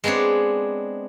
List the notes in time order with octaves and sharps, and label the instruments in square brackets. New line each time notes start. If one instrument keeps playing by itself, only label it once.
[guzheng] G#3 B3 C4 D4 C#5